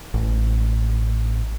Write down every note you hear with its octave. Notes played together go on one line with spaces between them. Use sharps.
A1